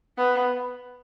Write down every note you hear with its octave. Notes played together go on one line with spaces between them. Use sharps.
B3